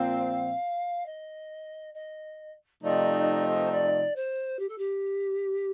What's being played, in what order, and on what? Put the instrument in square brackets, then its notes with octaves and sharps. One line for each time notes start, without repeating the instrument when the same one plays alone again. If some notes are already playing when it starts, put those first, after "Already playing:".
Already playing: [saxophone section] A#2 F3 C4 [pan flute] F5
[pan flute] D#5
D#5
[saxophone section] C3 F3 A3 D#4 [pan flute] D5
[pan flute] A4
A#4
C5
D5
C5
G4
A4
G4